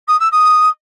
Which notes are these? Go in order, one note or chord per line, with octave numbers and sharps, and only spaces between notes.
D#6
E6
D#6